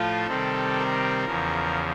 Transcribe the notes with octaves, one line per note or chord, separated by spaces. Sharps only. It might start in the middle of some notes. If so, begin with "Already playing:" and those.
Already playing: A2 F3 A3 F4 A4
C3 D#3 G3 C4
A#4
E2 C#3 F3